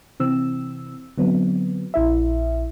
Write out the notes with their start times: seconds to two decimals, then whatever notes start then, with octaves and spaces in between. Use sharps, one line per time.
0.20 C3 E3 C4 E6
1.18 D3 F#3 B3 C4
1.94 A#1 E4 E5